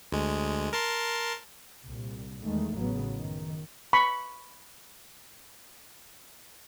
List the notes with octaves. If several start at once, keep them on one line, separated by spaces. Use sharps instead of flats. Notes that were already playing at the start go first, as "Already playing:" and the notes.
D2 G#3
A#4 A5 C6
C2 A#2
E2 D#3 G#3 A3
A1 C#3 F#3 B3
F#2 D#3
B5 C#6